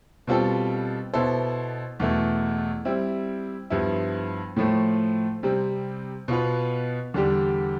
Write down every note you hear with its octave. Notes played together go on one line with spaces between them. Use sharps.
B2 G3 C4 F4 A4
B2 B3 E4 A4 C5
E2 B2 A3 E4
G3 C4 E4
G2 F3 B3 E4
A2 F3 A3
C3 G3 C4
B2 B3 F4 B4
E2 D3 G3 D4 G4